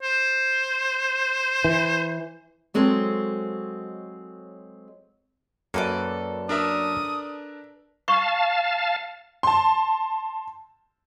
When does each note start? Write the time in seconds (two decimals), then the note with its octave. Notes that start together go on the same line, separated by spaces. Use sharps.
0.03 C5
1.64 E3
2.74 F#3 G#3 C4 A4 C5
5.74 F#2 A#3 A4 B4 D5
6.49 D4 A#4 E5 D#6
8.08 F5 A5 C#6
9.43 A5 C6